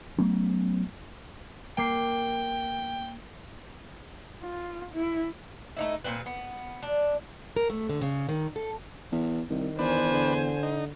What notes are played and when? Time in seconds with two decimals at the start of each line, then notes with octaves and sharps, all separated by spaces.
0.18 F#3 A3 B3 C#4
1.78 A#3 G5 D6 C7
4.43 F4
4.94 E4
5.77 A3 D#4 E4
6.04 A#2 C#3 C4 B4
6.26 B3
6.82 D4
7.56 A#4
7.70 A3
7.89 D3
8.01 C#3
8.29 D#3
8.56 A4
9.12 E2
9.50 C2 D#3
9.79 E2 D4 B4 C5 G#5
10.11 D3
10.63 D#4